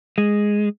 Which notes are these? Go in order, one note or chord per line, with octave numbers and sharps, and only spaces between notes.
G#3